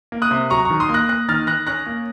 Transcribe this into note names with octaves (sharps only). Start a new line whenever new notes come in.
A#3
D#6 F#6
C3
F#3 A#5 C#6
D#3 A#5 C#6
C6 D#6
A#3
F#6 A#6
A#3 F#6 A#6
D#3 F6 A6
D#3 F#6 A#6
C#4 F#6 A#6
A#3